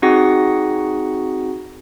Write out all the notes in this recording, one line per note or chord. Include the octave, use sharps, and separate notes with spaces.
C4 D#4 F#4 G#4 F#5 A#6